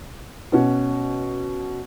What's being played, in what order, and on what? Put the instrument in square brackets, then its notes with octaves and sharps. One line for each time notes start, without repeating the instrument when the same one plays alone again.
[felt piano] B2 C#4 F#4